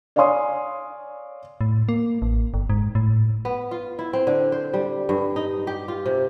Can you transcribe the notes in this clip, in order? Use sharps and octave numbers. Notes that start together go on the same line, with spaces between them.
C#5 D5 F5 G#5 C6 D#6
A2
A#3
A1
G1
G#2
A2
B3
F4
E4
C4
D3
C5
G3
G2
D#4
G4
F4
C3